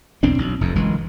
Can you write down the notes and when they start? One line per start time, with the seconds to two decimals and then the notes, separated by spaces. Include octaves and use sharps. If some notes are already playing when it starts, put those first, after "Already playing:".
0.23 B1 E2 C4 D4
0.38 B1
0.61 F1 F2
0.75 F#1 E3 G#3